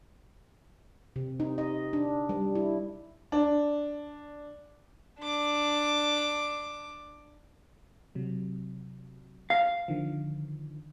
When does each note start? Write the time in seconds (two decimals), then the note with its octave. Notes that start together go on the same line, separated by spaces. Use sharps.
1.16 C3
1.40 D#4
1.58 D#5
1.93 D4
2.29 G3
2.55 E4
3.32 D4
5.20 D4 D6
8.15 C3 F#3
9.50 F5
9.88 D3 D#3 F3